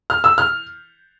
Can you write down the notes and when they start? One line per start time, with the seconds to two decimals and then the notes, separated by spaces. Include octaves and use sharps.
0.10 F6
0.24 E6
0.38 F6